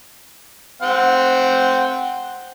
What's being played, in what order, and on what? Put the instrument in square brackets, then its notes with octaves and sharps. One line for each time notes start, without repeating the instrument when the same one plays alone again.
[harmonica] C4 F#5 G5